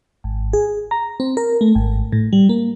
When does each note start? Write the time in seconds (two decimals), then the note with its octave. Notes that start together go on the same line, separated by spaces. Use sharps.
0.24 G#1
0.53 G#4
0.91 A#5
1.20 C4
1.37 A#4
1.61 A3
1.75 G#1
2.12 A2
2.33 G3
2.49 A#3